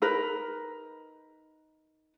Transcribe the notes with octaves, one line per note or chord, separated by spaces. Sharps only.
D#4 A#4 B4